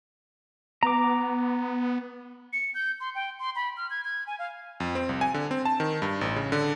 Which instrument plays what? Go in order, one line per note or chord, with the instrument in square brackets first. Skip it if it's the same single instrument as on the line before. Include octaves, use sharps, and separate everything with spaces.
[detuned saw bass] B3 [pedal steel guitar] A#5 D6
[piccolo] C#7
G6
C6
G5
C6
B5
F6
G#6
G#6
G#5
F5
[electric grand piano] F2
C4
C2
G#5
D3
C4
A5
D#3
G2
A1
C#3
D3